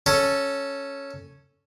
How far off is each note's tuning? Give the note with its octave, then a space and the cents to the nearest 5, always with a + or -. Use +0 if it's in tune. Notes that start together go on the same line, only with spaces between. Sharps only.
C#4 +0 A4 +0